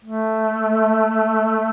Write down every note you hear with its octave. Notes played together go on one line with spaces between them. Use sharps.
A3